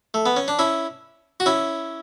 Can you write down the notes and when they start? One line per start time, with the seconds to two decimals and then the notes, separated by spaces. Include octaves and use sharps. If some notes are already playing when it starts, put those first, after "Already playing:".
0.14 A3
0.26 B3
0.36 C#4
0.48 D4
0.59 C#4 E4
1.40 F#4
1.46 C#4 E4